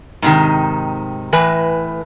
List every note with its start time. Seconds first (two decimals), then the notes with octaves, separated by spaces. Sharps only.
0.22 G#2 C3 D#3
1.33 A2 E3 B4 G#5